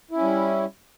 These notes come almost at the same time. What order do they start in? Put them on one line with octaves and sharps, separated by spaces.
E4 C#4 G3